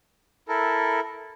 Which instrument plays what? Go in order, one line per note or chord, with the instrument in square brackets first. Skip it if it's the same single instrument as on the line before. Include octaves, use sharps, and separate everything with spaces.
[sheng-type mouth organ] E4 A4 A#4